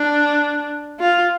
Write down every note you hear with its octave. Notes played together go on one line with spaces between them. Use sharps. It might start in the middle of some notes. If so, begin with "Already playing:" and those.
Already playing: D4
F4